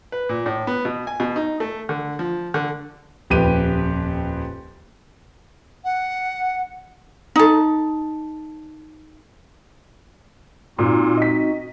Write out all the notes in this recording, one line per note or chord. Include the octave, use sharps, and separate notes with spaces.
B4
A#2
A2
B3
B2
G#5
B2
D#4
A3
D3
F3
D3
D#1 F2 G4 B4 D#7
F#5
D#4 A4
A#2 C4 D#4 F#4
D#5 B6